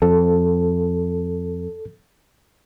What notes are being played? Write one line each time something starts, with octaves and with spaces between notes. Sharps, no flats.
F2 A4